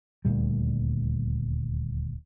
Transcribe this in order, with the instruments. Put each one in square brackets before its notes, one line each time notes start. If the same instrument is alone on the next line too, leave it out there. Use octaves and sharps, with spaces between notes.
[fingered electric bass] D#1 D2 A#2 G3